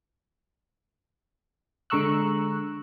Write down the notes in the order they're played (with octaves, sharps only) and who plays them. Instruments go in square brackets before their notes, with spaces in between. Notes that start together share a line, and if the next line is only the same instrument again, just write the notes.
[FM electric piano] D3 G#3 A#5 C#6 E6 F#6